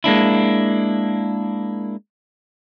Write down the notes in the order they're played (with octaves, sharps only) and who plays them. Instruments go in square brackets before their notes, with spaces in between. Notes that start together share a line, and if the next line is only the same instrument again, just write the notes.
[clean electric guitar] G#3 A#3 D4 E4